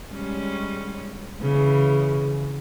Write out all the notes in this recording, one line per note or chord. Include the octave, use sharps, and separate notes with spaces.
G3 G#3 C#4
C#3 E3